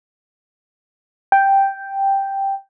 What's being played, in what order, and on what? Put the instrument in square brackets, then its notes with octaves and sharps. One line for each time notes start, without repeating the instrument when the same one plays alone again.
[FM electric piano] G5